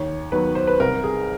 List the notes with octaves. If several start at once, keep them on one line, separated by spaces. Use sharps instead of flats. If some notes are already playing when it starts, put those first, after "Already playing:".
Already playing: D#2 C#5
D#3 F#3 B3 B4
C5
B4
C2 A#4
G#4